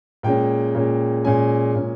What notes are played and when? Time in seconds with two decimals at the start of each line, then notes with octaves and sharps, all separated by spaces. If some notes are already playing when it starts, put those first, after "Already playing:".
0.23 A#2 G#3 C#4 G5
0.75 A#2 G#3 C#4
1.25 A#2 G#3 C#4 G#5
1.75 A#2 G#3 C#4